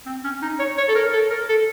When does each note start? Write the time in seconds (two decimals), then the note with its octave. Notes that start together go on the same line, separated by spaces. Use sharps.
0.06 C4
0.24 C#4
0.42 D#4
0.59 C#5
0.77 C#5
0.88 A4
0.95 A#4
1.13 A4
1.30 A#4
1.49 A4